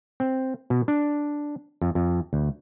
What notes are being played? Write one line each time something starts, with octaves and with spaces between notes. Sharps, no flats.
C4
B2
D4
F2
F2
D2